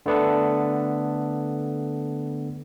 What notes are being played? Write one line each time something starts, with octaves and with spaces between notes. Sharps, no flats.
D3 A3 B3 D4 A4